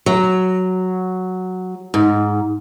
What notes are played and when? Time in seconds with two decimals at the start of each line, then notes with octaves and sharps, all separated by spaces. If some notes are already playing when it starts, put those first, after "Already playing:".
0.06 F#3
1.94 G#2